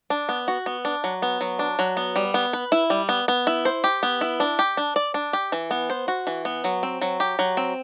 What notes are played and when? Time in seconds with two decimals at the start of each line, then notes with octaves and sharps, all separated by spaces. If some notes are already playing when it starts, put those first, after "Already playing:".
0.10 D4
0.29 B3
0.48 F#4
0.66 B3
0.85 D4
1.04 F#3
1.22 B3
1.41 F#3
1.59 D4
1.79 F#3
1.97 B3
2.16 G3
2.34 B3
2.53 B4
2.72 E4
2.90 G3
3.09 B3
3.28 B3
3.47 E4
3.65 C5
3.84 G4
4.03 B3
4.21 E4
4.40 D4
4.59 G4
4.77 D4
4.96 D5
5.14 D4
5.33 G4
5.52 E3
5.71 B3
5.90 C5
6.08 F#4
6.27 E3
6.45 B3
6.64 F#3
6.83 C4
7.02 F#3
7.20 G4
7.39 F#3
7.57 C4